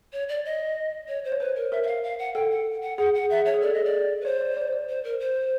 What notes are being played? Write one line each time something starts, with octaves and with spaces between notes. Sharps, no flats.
C#5
D5
D#5
C#5
C5
C#5
B4 C5
A#4
A#4 E5
E5
F5
F5
F#5
A4 G5
F#5
F#5
G#4 F#5
F#5
E5
C#5
G#4
A4 D5
D#5
D5
B4
C5 C#5
D5
D5
D5
C5
A#4
C5